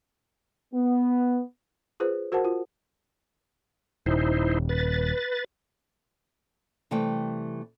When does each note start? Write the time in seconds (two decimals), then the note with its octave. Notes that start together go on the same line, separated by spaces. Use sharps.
0.74 B3
2.00 F4 G#4 B4 C5
2.32 F#4 A#4 C5 F#5 A5
2.45 F4
4.06 D#1 D#4 E4 C5
4.69 B4 A6
6.91 C3 E3 G3 A3 G5